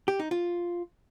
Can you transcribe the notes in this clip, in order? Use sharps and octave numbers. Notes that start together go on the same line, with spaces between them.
G4
D#4
F4